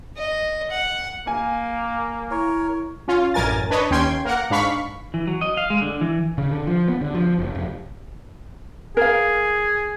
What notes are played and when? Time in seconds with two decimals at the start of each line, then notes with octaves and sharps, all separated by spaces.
0.17 D#5
0.71 F#5
1.27 A#3 G#5
2.31 E4 A#4 C#5
3.08 C#4 F4
3.34 A1 F#2 A#4 G#5 A6
3.70 D4 B4 C#5 D#5
3.91 D#2 C#4 G5 C6 G#6
4.25 A#3 A#4 F#5
4.50 G#2 D4 F5 B5 C#6 B6
5.14 E3
5.27 F#3
5.41 D#5
5.57 F5
5.70 G#3
5.82 D3
6.01 E3
6.38 C#3
6.51 D3
6.67 F3
6.89 B3
7.01 D3
7.14 F3
7.39 F#1
7.55 F1
8.97 G#4 A#4 F5